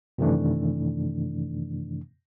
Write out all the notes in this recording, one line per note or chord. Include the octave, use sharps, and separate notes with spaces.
F#2 C3 D#3 E3 A3 D4